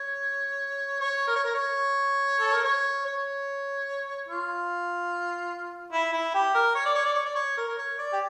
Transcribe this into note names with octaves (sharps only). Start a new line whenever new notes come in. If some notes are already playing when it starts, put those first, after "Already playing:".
Already playing: C#5
C#5
A#4
C#5
A#4
C#5
A4
A#4
C#5
C#5
F4
E4
E4
G4
A#4
C#5
D5
C#5
D5
C#5
D5
C#5
A#4
A#4
C#5
D5
G4